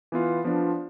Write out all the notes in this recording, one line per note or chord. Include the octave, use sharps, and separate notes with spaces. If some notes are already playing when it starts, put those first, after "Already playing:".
E3 B3 F4
F3 B3 D4 F4